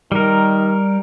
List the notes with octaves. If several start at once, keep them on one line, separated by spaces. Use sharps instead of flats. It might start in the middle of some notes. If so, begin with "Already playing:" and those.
D#3 G3 A#4